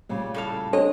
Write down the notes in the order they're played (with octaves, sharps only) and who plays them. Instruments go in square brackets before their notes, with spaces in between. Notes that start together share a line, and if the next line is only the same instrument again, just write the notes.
[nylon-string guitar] A#2 C#3 G3
[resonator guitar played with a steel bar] A2 A4 F5
[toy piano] D4 A4 C5 [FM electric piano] C#5 [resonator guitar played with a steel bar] D#5